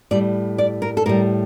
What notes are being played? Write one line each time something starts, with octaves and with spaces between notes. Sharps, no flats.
A2 G3 D5
D5
A#4
A4
A2 G3 A#4